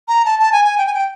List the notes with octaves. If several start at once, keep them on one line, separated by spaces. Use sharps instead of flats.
A#5
A5
A5
G#5
G#5
G5
G#5
G5